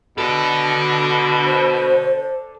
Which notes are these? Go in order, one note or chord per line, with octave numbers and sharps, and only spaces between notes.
B2 A4 D5
C5